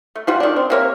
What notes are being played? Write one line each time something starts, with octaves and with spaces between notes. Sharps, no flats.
A3
G3 F4 F#4
D#3 D4
C4
C3 A#3 C#5